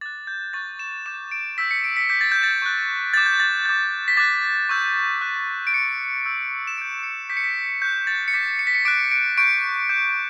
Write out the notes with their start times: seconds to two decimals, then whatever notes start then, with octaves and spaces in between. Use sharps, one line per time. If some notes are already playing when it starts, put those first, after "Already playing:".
0.01 D6 F#6 A6
0.27 G6
0.53 C#6 F#6 A6
0.79 E7
1.06 D6 G6 E7
1.31 D7
1.57 C#6 E6 G6 B6
1.71 C#7
1.84 D7
1.96 B6
2.09 D6 G6 B6
2.21 A6
2.32 G6
2.43 A6
2.62 C#6 F#6
3.13 D6 G6 A6
3.26 G6
3.40 A6
3.66 D6 G6
4.08 B6
4.17 D6 F#6 A6
4.69 C#6 E6 G6
5.21 D6 F#6
5.67 D7
5.73 D6 G6 C#7
6.25 C#6 E6 G6
6.67 E7
6.77 D6 G6 D7
7.03 C#7
7.29 D6 G6 B6
7.37 C#7
7.44 B6
7.81 C#6 F#6 G6
8.07 A6
8.28 C#7
8.33 D6 G6 B6
8.59 C#7
8.67 B6
8.75 C#7
8.85 D6 F#6 D7
9.11 D7
9.38 C#6 G6 D7
9.89 D6 G6